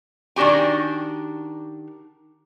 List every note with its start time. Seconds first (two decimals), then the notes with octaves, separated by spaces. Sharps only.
0.36 D#3 D4 F#4 G4 G#5